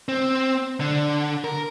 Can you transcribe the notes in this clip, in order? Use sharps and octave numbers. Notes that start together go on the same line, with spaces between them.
C4
D3
A#4